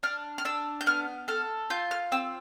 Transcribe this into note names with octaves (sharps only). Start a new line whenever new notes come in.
D4 F6
F6
D4 E6
G6
B3 F6
A4 F6
F4 G6
F6
C4 E6